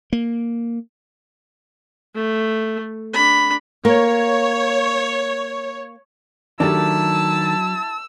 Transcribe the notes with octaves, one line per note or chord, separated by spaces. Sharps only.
A#3
A3
D4 B5
A#3 C#5
D#3 F#3 A3 D4 E4 G4 A5 E6